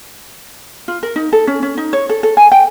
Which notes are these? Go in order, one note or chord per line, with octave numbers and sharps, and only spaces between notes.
F4
A#4
D#4
A4
C#4
C#4
D#4
C#5
A4
A4
G#5
G5